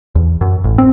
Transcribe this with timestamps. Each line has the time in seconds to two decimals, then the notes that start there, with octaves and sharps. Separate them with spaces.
0.15 E2
0.41 F#2
0.64 A1
0.78 C4